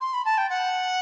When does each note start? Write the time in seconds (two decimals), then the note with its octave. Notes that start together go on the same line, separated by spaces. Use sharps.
0.01 C6
0.13 B5
0.25 A5
0.38 G5
0.50 F#5